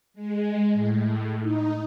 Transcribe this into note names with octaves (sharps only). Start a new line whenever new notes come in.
G#3
A2
D#4